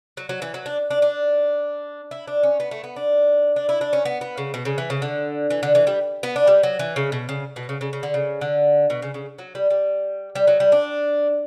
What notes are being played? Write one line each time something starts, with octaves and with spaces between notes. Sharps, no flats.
F#3
F#3
E3
F#3
D4
D4
D4
E4
D4
C#4
B3
A3
B3
D4
D4
E4
D4
C#4
B3
B3
C#3
B2
C#3
E3
C#3
D3
E3
D3
E3
G3
B3
D4
G3
F#3
E3
C#3
B2
C#3
B2
C#3
C#3
C#3
D3
C#3
D3
B2
C#3
C#3
F#3
G3
G3
G3
F#3
G3
D4